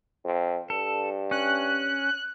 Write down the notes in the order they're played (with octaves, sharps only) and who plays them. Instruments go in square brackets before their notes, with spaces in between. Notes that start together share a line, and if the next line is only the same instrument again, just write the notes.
[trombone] F2
[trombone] G2 [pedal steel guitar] A4
[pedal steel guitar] C#4 [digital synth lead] F#6